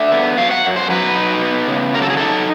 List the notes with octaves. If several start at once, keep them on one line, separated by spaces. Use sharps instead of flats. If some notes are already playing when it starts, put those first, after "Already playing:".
Already playing: D3 E5
B3
F#3 F5
F#5
F#2
C5
F#3 B4
D#4
B3
C#3
F#3 A#4
A4
G#4
D#4 A4